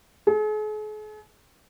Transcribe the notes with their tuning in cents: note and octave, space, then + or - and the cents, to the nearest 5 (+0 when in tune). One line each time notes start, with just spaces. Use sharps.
G#4 +45